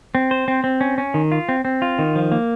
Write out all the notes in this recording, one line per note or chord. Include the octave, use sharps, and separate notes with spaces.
C4
C5
C4
C4
C#4
C#4
D#3
F4
C4
C4
F4
D#3
F3
A#3